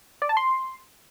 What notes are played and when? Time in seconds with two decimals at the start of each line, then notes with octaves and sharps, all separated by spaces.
0.22 D5
0.29 A5
0.37 C6